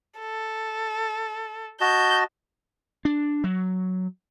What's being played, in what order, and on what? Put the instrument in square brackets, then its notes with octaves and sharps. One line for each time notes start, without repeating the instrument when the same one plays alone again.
[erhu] A4
[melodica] F#4 D#5 A5 [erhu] G6
[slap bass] D4
F#3